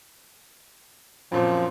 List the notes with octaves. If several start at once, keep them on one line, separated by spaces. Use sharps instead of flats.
F#2 A#2 F3 C4